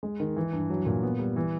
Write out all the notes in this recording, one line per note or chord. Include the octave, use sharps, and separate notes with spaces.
G#3
D#3
E3
G2
F#3
A#2
B3
G3
E3